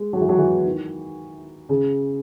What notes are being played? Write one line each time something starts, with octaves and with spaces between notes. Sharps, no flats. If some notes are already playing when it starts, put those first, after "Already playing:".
Already playing: G#3
F#3
E3
F#3
E3
D#3
C#3